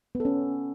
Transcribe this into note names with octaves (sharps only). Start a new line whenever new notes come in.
B3
A4
C#4